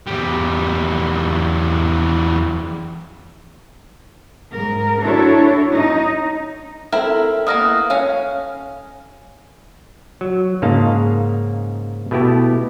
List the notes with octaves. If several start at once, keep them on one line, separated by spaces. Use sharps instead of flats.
E2 G3
G#2 A#4
D4 E4 F#4 A4 C#5
D#4
C4 E4 A4 A#4 E5
A#3 B3 E4 D#6 F6 A#6
C#4 F5
F#3
G#2 C#3 A#3 D#4 F5 A5
B2 A3 B3 E4 G4